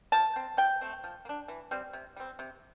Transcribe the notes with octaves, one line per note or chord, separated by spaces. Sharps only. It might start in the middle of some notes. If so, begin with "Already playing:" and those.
F3 A5
C4
F3 G5
A3 C4
F3
A#3
D4
E3
G3 C4
C3
G3 C4
C3